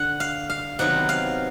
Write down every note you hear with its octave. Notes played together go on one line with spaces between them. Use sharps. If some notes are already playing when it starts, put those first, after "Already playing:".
Already playing: D3 F#5
F5
F5
C3 D#3 F#3 B3 F#5
F5